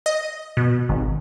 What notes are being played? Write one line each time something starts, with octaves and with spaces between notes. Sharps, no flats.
D#5
B2
G#1